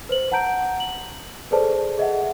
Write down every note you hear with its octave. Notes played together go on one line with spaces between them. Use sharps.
B4 C5 F#7
F#5 A5 A#5 G6 D7
F#7
G#4 A4 B4 C5 D5 A5
G#4 D#5 E5 F#5